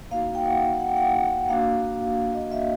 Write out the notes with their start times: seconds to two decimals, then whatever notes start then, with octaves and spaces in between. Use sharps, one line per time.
0.11 A#3 D#4 F#4 F5
0.35 G5
0.46 F#5
0.80 F#5
0.88 G5
0.96 F#5
1.14 F#5
1.49 A#3 D4 F#4 F5
2.35 D#5
2.52 E5